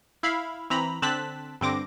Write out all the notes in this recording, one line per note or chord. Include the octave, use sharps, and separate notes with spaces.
E4 F5 B5
E3 C4 A#5 B5
D3 C4 A5 F#6 B6
G2 D3 C4 D6 A#6